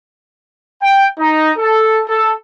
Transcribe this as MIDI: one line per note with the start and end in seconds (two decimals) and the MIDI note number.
0.82 1.05 79
1.19 1.52 63
1.58 2.00 69
2.08 2.32 69